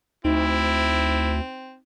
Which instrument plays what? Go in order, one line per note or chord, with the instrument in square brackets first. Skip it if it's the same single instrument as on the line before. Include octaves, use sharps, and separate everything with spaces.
[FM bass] D2 [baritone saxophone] C4 [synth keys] D#4 [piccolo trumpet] E4